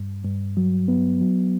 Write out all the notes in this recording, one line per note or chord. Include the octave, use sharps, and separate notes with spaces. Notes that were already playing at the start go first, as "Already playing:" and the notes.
Already playing: G2
G2
F#3
B3
F#3